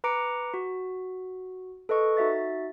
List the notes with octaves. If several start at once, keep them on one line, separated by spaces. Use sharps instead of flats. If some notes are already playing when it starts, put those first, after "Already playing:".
B4 A#5 D6 C#7 D7
F#4
A4 B4 D#5 C#6
D#4 F#4 E5 A6